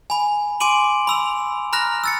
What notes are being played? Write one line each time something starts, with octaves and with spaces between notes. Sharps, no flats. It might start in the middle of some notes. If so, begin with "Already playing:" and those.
G#5 B5
G#5 C6 D6 D7 D#7 F#7
B5 E6 F7
A#5 B5 F6 F#6 A#6
E6 A6 C#7